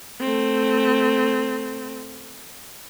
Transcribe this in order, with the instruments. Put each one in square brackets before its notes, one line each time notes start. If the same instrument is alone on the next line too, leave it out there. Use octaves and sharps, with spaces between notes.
[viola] A3 C4